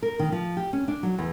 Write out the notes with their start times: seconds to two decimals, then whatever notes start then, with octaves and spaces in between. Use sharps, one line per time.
0.02 A#4
0.19 D#3
0.32 F3
0.57 G4
0.73 C#4
0.88 D4
1.03 F#3
1.18 E2